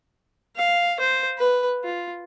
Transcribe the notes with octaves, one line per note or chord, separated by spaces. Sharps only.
F5
C5
B4
F4